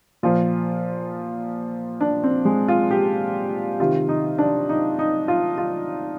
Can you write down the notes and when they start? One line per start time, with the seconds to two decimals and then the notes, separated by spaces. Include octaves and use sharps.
0.23 A#2 F3 F4
2.01 D4
2.24 C4
2.45 G#3
2.68 F4
2.91 G4
3.80 C3 D#3 F4
4.09 D#4
4.38 D4
4.69 D#4
4.99 D#4
5.28 F4
5.58 F4